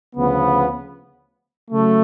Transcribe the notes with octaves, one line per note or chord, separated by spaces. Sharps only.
D2 C#3 F3 B3
C#3 F#3 A3